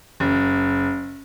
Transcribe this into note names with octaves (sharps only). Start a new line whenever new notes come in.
F#1